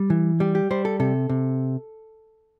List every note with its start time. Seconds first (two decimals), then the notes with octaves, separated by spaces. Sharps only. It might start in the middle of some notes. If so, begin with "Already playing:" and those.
Already playing: G3
0.10 E3
0.40 G3 G4
0.55 G4
0.71 G3 C5
0.85 A4
1.00 C3 A4
1.29 C3